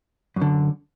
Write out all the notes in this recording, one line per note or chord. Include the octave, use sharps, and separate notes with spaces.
F#2
D3